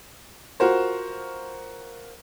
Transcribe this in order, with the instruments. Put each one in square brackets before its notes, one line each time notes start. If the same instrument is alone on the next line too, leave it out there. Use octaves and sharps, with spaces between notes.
[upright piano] F4 F#4 A#4 C5